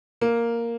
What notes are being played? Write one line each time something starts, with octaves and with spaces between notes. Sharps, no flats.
A#3